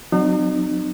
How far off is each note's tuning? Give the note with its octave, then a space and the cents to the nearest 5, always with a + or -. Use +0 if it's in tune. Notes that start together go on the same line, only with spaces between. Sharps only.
F#3 +5 C4 -30 D#4 -40